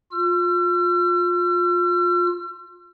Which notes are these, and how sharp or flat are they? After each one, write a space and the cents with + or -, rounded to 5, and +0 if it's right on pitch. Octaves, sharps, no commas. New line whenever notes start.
F4 +25 E6 +45